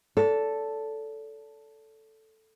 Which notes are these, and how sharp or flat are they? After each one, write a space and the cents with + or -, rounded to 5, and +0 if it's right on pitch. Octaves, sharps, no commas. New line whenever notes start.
A4 +0 D5 -40